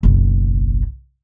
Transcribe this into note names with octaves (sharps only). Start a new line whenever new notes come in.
F#1 B1